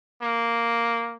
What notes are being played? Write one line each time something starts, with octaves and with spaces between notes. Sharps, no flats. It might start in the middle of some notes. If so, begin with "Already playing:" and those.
A#3